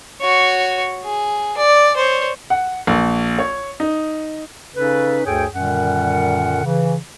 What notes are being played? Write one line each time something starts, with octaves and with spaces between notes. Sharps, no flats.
F#4 C#5
G#4
D5
C5 C#5
F#5
A#1
C#5
D#4
C#3 C#4 D#4 A4 B4
D2 G2 G#4 A4 C#5 G5
F#2 A#2 D3 D#3 G3 F#5
C#3 E3